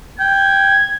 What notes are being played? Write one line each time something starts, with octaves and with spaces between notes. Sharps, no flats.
G5 G#6